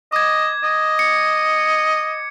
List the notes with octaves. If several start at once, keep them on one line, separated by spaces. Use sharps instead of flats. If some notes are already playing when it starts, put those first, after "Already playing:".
D#5 D6 G#6
D#5
C#7